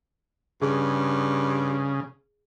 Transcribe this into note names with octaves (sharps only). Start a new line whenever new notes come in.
G2 C#3 G#4